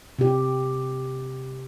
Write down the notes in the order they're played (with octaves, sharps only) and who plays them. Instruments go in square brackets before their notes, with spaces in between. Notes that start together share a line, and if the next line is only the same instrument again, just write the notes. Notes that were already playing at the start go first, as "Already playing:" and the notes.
[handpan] C3 G4